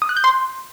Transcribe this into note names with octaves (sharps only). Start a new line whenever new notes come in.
D#6
F#6
G6
C6